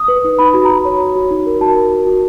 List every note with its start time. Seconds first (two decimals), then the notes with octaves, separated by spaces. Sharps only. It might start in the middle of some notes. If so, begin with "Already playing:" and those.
Already playing: D#6
0.08 B4
0.24 D#4
0.39 D#4 B5
0.54 F#4
0.65 A#5
0.69 F#4 B5
0.85 C#5
1.01 F#4
1.16 F#4
1.30 D#4
1.46 A#4
1.61 F#4 A5
1.76 A#4
1.91 F#4
2.06 F#4